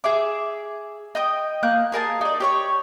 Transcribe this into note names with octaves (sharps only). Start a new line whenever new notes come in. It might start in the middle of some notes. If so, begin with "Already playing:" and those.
G#4 E5 D6
D#5 G5 D#6
A#3 F#6 G6
G#4 A#4 G#5 A5
D#4 D5
G4 C#5 C#6